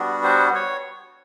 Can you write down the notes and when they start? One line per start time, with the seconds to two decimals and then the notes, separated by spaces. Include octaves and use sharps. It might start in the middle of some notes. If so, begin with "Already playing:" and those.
Already playing: G3 B3 D4 F#4
0.24 C5
0.55 C#5